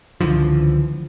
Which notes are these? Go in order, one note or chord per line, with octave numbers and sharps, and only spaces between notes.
C#2 D3 E3 F3